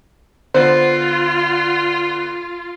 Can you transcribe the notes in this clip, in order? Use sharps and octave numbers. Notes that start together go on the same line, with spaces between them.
D3 B3 F4 C5